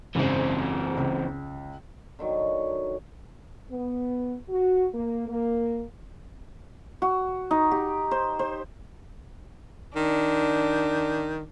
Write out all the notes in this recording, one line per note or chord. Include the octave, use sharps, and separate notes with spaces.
F#1 G#2 C#3 E3 C4
C#2
D3 D#3 F#3 C#5
B3
F#4
A#3
A#3
F#4
D#4
G4
C5
C5
D#3 D4